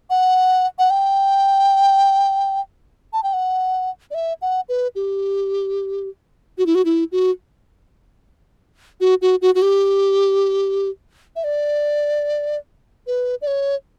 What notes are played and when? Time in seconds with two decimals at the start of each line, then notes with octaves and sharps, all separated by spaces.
0.10 F#5
0.79 F#5
0.90 G5
3.13 A5
3.23 G5
3.33 F#5
4.11 D5
4.14 E5
4.42 F#5
4.69 B4
4.95 G4
6.58 F#4
6.66 E4
6.75 F#4
6.85 E4
7.12 F#4
9.01 F#4
9.22 F#4
9.42 F#4
9.55 F#4
9.62 G4
11.36 E5
11.44 D5
13.07 B4
13.42 D5
13.47 C#5